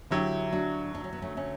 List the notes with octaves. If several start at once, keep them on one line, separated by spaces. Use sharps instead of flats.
D2 D3 F#3 E4 G4
D4 F#4
D4
C#4
B3
A3 C#4
A3 C#4